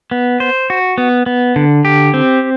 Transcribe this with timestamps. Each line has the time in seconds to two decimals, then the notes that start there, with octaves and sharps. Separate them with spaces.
0.11 B3
0.40 C5
0.70 F#4
0.98 B3
1.26 B3
1.56 D3
1.85 G4
2.14 C4